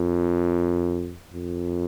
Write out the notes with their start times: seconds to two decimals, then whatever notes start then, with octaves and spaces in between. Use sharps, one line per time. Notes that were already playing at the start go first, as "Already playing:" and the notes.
Already playing: F2
1.34 F2